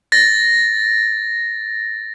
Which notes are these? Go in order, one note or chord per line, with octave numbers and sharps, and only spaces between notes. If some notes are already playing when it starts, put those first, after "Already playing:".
A6 A#6